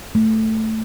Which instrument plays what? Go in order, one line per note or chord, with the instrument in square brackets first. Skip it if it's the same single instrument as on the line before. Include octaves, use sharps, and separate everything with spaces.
[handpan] A3